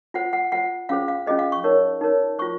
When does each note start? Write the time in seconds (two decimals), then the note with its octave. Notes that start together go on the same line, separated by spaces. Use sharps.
0.14 F4 C5 F#5
0.33 F#5
0.52 F4 C5 F#5
0.89 C#4 F4 G#4 C5 F5
1.08 F5
1.26 C#4 F4 G#4 C5 D#5
1.39 F5
1.52 C#6
1.64 D#4 A#4 C#5
2.01 D#4 A#4 C#5
2.39 F4 C5 C#6